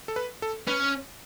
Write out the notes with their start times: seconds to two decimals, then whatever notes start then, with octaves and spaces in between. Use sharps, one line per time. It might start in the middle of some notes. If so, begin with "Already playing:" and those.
0.08 A4
0.16 B4
0.42 A4
0.67 C#4 B4